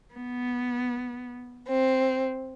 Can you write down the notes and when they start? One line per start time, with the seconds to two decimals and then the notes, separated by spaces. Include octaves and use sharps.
0.14 B3
1.68 C4